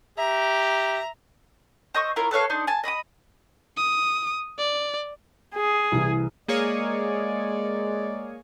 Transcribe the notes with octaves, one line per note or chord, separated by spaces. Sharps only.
G4 E5 A#5
C5 D#5 C#6 E6
E4 F4 A#4 C#5
A4 B4 C#5 F5
D4 D#4 C5
G#5 A5
D#5 B5 D6 D#6
D#6
D5
G#4
C2 E3
G#3 A#3 G#4 C#5 D5